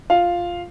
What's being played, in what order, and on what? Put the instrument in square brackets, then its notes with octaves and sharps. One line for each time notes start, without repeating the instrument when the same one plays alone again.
[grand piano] F4 F5